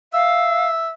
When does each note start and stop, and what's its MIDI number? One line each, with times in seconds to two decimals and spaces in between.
0.13 0.91 76
0.13 0.68 77